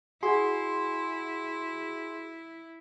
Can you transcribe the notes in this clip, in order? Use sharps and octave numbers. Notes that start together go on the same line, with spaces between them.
E4 F#4 G#4 C6